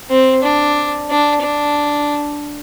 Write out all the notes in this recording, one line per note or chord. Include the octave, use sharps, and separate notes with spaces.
C4
D4
D4
D4